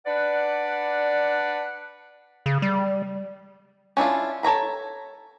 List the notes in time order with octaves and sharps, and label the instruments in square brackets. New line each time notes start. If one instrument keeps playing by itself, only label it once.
[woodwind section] D4 B4 D5 F#5
[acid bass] C#3
G3
[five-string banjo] C#4 D4 E4 F4
A4 C#5 A#5 B5